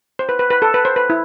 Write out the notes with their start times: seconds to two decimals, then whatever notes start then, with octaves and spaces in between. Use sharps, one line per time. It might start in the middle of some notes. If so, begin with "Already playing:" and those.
0.19 C5
0.29 B4
0.39 B4
0.50 B4
0.62 A4
0.74 B4
0.85 C5
0.96 B4
1.10 E4